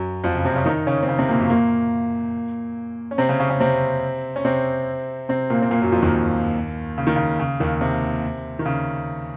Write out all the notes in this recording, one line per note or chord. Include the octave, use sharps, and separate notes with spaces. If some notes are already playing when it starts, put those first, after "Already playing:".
Already playing: F#2 F#3
F2 F3
C#3
C3 C4
C#3 C#4
D#3 D#4
C#3 C#4
C4
C#3 C#4
C3 C4
A#2 A#3
F#2 F#3
A#2 A#3
C#4
C3 C4
C#3 C#4
C#3 C#4
C#3 C#4
C3 C4
C#4
C3 C4
C3 C4
A#2 A#3
C4
A#2 A#3
F#2 F#3
F2 F3
D#2 D#3
C#3
D#3
C#3
C#3
D#2 D#3
C3
D#3
C#3